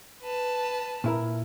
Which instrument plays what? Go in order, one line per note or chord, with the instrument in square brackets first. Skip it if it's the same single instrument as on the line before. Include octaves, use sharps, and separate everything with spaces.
[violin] B4 A5
[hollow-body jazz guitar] A#2 E4 A#4